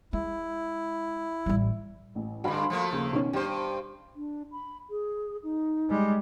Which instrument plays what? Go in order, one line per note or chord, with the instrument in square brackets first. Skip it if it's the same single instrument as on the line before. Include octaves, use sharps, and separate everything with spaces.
[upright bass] G#3 [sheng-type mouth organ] E4
[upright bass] A1 G3
[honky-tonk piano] A1
[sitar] G2 D3 [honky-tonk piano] F#4 F5 B5
[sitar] F3 A3 A#3
[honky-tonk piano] D#2 C#3
B2 D#3 C#4
[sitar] G2 C5 [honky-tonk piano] G4
[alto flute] D4
B5
G#4
D#4
[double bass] G3 G#3